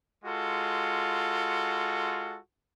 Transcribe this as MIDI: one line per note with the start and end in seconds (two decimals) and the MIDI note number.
0.25 2.38 56
0.25 2.38 65
0.25 2.38 66
0.25 2.38 69